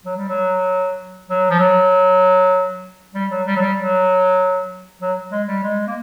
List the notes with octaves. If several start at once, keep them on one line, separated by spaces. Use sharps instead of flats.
F#3
G3
F#3
F#3
F3
F#3
G3
F#3
G3
F#3
G3
F#3
F#3
G#3
G3
G#3
A#3